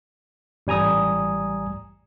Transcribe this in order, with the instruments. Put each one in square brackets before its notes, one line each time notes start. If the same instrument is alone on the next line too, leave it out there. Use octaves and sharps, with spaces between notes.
[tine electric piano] A1 G3 G#5 A#5 D#6